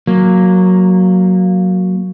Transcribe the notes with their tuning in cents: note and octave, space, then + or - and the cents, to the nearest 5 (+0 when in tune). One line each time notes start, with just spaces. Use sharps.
F#3 -5 A#3 +0